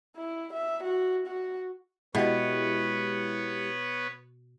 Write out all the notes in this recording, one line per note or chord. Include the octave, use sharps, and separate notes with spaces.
E4
E5
F#4
F#4
B2 G#3 B3 E4 G4 B4 C#5